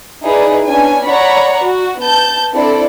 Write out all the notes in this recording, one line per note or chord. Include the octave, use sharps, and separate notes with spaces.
D#4 E4 G#4 B4 D5
B3 C#4 D4 G#5
C#5 D5 F#5 A#5 B5 C#6
F#4
B3 A5 G6
C4 D4 E4 A4 D5